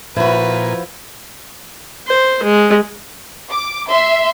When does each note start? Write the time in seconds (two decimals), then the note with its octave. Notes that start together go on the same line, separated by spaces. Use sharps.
0.16 A#2 F3 E4 F#4 B4
2.08 C5
2.43 G#3
3.51 D6
3.89 E5 C6